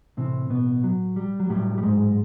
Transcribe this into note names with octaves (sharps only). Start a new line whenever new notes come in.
A2 C3 E3 C4
B2 B3
F#3
G3
F#3
A2 F#3 G3
G3
G#2 G#3